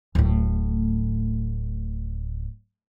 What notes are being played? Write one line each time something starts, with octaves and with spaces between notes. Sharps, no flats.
D1 A2